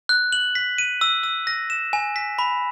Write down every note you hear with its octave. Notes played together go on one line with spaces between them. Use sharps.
F#6
F#7
B6
D#7
E6
E6
A#6
E7
G#5
B6
B5